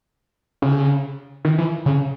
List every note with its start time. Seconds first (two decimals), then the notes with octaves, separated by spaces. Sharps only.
0.62 C#3
1.45 D#3
1.58 E3
1.86 C#3